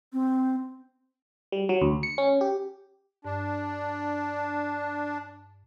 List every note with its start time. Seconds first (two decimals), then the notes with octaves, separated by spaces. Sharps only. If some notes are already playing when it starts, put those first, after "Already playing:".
0.13 C4
1.52 G3
1.69 F#3
1.82 D2
2.03 C#7
2.18 C#4
2.41 G4
3.24 G2 D4